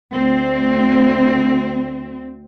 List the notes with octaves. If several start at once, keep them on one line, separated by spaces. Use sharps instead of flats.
D2 C4